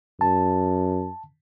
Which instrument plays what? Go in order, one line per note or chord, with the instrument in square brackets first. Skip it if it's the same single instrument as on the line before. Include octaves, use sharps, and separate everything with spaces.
[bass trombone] F#2 [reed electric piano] A5